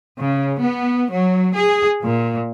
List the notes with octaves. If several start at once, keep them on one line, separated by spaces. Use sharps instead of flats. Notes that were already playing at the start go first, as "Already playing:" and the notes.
C#3
B3
F#3
G#4
A#2